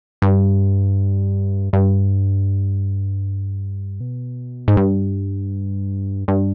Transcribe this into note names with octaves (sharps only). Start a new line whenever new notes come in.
G2
G2
B2
G#2
G2
G2